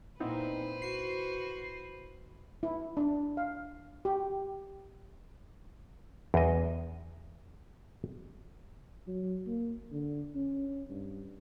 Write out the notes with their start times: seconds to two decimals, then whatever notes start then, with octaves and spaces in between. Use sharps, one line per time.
0.20 A#2 B3 C4 D#4 E4 B4 C5
0.82 F#4 C7
2.63 E4
2.97 D4
3.37 F5
4.05 G4
6.34 E2 D#5
9.07 F#3
9.47 A#3
9.92 D3
10.36 C#4
10.90 G2